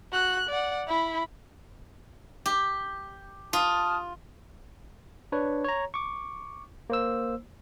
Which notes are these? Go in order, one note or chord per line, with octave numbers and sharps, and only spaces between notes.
F#4 F#6
D5 F#5
E4 B5
G4
F4 A5 D#6 F6
D4 B4 C#5
C#5 A#5
C#6 D6
A#3 C5 E6